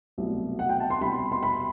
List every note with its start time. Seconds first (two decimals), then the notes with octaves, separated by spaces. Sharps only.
0.18 C2 B2 F#3 A3
0.59 F#5
0.69 G5
0.80 A5
0.90 C6
1.01 C2 B2 G3 B5
1.32 C6
1.43 B5